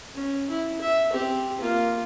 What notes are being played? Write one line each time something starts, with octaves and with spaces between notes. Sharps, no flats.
C#4
E4
E5
C4 G4
A#3 F4